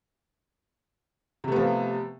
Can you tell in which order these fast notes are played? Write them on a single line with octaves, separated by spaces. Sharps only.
C3 A3 B3 F3